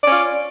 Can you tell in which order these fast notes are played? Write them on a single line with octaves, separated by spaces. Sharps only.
D5 C#4 F4